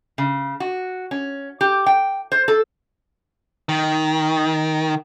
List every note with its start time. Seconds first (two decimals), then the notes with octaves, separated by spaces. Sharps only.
0.18 C#3
0.60 F#4
1.11 C#4
1.61 G4
1.86 G5
2.32 C5
2.48 A4
3.69 D#3